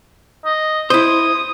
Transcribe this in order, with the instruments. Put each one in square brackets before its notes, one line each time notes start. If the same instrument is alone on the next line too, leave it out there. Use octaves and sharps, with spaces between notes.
[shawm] D#5
[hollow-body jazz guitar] E4 C5 [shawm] D#6